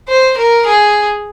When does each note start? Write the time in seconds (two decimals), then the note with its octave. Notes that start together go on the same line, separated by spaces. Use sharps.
0.09 C5
0.37 A#4
0.66 G#4